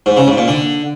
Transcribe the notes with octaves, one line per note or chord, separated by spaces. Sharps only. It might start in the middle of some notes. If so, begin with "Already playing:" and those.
G#2
C#3
G#2
A#2
D3